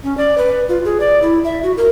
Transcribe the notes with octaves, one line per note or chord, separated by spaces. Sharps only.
C#4
D5
B4
F4
G#4
D5
E4
E5
F#4
A#4